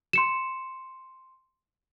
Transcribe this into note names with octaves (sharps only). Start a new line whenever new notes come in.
C6 C#7 E7